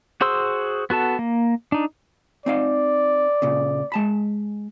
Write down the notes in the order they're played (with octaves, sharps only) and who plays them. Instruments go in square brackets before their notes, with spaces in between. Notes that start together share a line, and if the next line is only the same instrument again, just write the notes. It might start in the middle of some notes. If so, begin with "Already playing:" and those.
[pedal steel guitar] F#4 G#4 C5 C6 E6
B3 F#4 A4 A5
A#3
D4 D#4
[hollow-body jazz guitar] C4 D#4 F5 [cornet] D5
[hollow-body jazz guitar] A#2 C#3
G#3 A5 B5